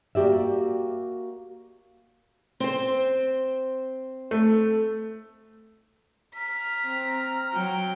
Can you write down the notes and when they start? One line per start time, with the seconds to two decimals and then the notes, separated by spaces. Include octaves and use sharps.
0.15 A#3 F#4 G4 D5 E5
2.60 C4 C5
4.31 A3
6.35 A#5 F6 B6
6.84 C4
7.54 F#3 G5